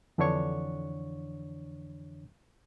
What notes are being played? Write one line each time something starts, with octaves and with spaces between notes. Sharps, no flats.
F2 D3 E3 D4 C#5 C#6